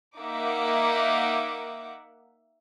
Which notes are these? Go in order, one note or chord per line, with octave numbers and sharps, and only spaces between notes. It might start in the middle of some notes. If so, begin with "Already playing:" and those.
A#3 D#4 E5 F#5 D6